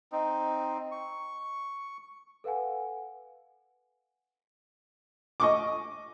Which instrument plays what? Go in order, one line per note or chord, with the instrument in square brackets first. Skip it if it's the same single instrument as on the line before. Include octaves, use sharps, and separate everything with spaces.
[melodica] C4 D#4
C#6
[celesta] A4 B4 F5 F#5 G#5
[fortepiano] D#5 C#6 D6